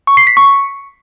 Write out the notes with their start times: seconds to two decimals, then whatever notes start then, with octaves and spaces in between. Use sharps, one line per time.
0.07 C#6
0.17 C7
0.27 B6
0.37 C#6